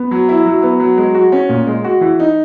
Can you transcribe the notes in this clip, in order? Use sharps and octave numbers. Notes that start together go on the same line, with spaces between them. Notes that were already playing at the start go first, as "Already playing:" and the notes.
Already playing: B3
F#3
E4
F#3
B3
F#3
G#3
F#4
C#4
A#2
G#3
F#4
E3
D#4